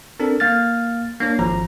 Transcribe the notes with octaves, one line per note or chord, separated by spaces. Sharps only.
C4 D4 A4 A#4
A#3 F5 F6 A6
A#3 D4 C#5
G#1 F3 A#5